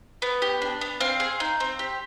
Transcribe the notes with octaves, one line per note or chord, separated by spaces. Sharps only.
B3
G4
D4
B3
C4 F5
G#4
D#4
C4
G4